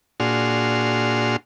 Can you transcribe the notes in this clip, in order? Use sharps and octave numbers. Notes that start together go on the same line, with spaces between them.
A#2 D4 F#4 G#4 C6 F6